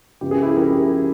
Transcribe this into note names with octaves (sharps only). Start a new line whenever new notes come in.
C#2 C#3 F3 G4
G#4
E4 G4
C#3 F3 G4 A#4